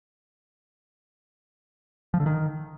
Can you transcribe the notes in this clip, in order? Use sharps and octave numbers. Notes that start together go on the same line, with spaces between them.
F3
D3
D#3